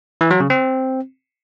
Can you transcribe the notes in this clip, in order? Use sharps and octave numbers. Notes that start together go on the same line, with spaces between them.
E3
F#3
C#3
C4